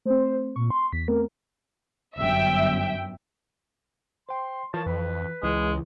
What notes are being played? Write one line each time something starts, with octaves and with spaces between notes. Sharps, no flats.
A3 C4 C5
A#2 C#6
C6
E2 B6
A3 B3 C4 A#4
G1 F#2 E5 G5
C5 G5 C6
E3 F3 A#4 C#5 A5
F2 B4
C#2 C#3 E3 G#3 E4